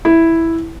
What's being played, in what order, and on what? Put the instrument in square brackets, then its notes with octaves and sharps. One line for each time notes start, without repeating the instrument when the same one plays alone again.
[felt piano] E4